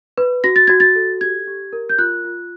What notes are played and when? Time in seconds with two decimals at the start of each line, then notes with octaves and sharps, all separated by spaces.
0.18 B4
0.44 F#4 A#6
0.56 A6
0.68 F#4 G#6
0.80 A6
0.95 A4
1.21 G4 G#6
1.47 G4
1.73 A#4
1.89 G6
1.98 F4 F#6
2.25 F4